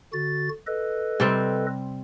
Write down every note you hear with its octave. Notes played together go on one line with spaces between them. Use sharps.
D3 F#4 A6
A4 B4 D#5
C3 G3 C4